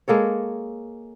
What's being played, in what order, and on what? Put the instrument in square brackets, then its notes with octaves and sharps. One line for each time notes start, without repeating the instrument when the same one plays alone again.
[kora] G#3 A#3 A4 C#5